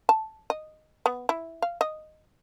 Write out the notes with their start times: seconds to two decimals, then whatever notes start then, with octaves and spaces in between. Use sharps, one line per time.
0.09 A5
0.50 D#5
1.06 B3
1.29 E4
1.62 F5
1.81 D#5